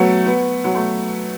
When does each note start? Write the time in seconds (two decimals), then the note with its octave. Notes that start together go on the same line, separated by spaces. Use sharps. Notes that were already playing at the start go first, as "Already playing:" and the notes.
Already playing: F#3 A3 B3
0.26 B3
0.64 F#3
0.75 A3